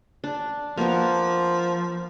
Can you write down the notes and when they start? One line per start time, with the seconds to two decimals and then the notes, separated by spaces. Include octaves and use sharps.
0.24 D4
0.77 F3 A#3 B3 A#4